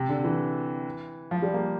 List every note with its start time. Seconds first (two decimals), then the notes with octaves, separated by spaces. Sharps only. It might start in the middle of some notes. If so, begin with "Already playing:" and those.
Already playing: C3
0.09 D3
0.24 E3
1.31 F3
1.42 G3
1.54 A#3